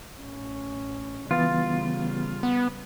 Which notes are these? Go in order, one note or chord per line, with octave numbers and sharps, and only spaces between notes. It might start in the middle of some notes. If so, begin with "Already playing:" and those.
A1 C#4
C#3 E3 G3 B3 F4 A6
B3